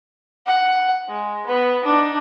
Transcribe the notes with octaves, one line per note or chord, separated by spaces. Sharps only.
F#5
G#3
B3 B4
D4 D#4